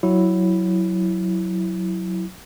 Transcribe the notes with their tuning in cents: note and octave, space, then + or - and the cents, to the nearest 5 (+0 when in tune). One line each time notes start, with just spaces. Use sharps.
F#3 +0 E4 +0